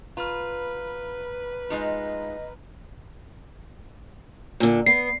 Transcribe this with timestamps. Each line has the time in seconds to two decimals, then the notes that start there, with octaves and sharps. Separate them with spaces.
0.17 F4 B4 A#5 B5 F6
1.70 G#3 D#4 F4 D#5 A#5
4.60 A#2 D3
4.86 B3 C7